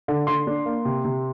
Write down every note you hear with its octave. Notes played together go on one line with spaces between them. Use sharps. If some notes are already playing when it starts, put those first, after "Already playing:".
D3
D3 C6
D4
A#3
C3
C3